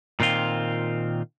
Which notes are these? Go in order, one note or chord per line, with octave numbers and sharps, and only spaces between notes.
A#2 D#3 C4 F4